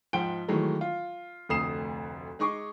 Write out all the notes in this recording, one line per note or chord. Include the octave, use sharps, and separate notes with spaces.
G#2 F3 F#5 G5 D7 G7
D#3 E3 F#3 G#3 A3
F4
F1 D2 D#6 C7 E7
G#3 D#4 G#4 C#6 D6